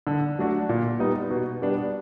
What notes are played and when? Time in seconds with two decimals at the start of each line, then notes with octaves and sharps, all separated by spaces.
0.07 D3
0.39 F#3 A3 D4 F#4
0.69 A#2
0.99 G3 B3 D#4
1.30 B2
1.62 G3 B3 D4